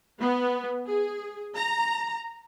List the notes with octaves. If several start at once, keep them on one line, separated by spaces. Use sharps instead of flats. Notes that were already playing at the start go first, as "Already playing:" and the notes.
B3
G#4
A#5